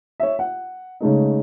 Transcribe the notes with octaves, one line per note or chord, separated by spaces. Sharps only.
C#5 E5
F#5
C#3 G#3 A3 D#4